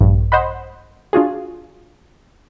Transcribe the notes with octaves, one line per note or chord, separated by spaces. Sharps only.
A#1 G2
C5 D#5 F#5 B5
D4 F4 F#4 G#4